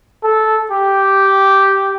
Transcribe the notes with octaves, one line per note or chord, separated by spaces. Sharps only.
A4
G4